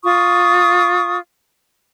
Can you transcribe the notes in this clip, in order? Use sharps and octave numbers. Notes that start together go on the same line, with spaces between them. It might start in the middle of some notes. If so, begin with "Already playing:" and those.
F4 C#6 D#6